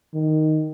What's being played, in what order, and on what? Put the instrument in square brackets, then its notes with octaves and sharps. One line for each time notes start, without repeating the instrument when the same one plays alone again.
[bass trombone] D#3